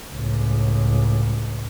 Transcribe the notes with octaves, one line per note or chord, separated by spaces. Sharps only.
C#2 A2